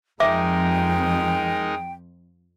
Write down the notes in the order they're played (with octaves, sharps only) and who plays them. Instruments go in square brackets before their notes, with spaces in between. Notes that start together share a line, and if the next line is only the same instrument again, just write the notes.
[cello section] F2 F3 [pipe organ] G#3 D#4 A#4 [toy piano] E5 D6 [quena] G5